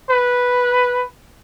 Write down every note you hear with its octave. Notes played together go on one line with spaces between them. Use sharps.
B4